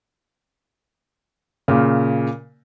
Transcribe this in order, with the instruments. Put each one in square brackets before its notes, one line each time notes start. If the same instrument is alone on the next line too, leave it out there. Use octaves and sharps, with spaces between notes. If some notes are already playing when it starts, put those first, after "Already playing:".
[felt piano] A#2 C#3